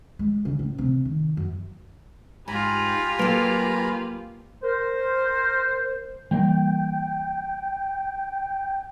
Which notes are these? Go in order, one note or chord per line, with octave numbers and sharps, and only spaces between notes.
G#3
C#3
A2
C3
D#3
F#2
G#2 F4 G4 G#5 A#5 B5
F#3 A#3 A4 B4
A#4 C5
E3 G3 A#3 G5